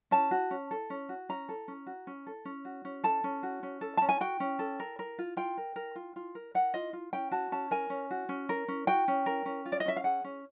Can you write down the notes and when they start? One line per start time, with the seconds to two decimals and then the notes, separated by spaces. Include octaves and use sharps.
0.11 C#4 A5
0.31 F#4
0.51 C#4
0.71 A4
0.90 C#4
1.09 F#4
1.29 C#4 A#5
1.49 A4
1.68 C#4
1.87 F#4
2.07 C#4
2.27 A4
2.45 C#4
2.65 F#4
2.85 C#4
3.04 A4 A5
3.24 C#4
3.43 F#4
3.63 C#4
3.81 A4
3.97 C#4 A5
4.09 G#5
4.21 F#4 G5
4.40 C#4
4.59 A4
4.80 A#4
4.99 A#4
5.19 F4
5.37 F4 G5
5.57 A#4
5.76 A#4
5.95 F4
6.16 F4
6.35 A#4
6.54 A#4 F#5
6.74 F4 D#5
6.93 F4
7.13 C#4 G5
7.31 F#4 A5
7.52 C#4 A5
7.71 A#4 G#5
7.90 C#4
8.11 F#4
8.29 C#4
8.49 A#4
8.68 C#4
8.87 F#4 G5
9.08 C#4
9.26 A#4
9.46 C#4
9.66 F4
9.72 D5
9.80 D#5
9.86 C#4 E5
9.96 F5
10.04 G#4 F#5
10.24 C#4